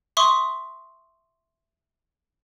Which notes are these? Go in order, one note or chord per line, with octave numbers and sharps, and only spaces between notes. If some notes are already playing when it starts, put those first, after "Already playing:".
E5 C6 C#6 D#6